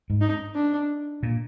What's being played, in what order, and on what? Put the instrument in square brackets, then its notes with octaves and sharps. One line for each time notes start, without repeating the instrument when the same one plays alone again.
[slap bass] G#2
[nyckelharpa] D#4
D4
[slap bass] A#2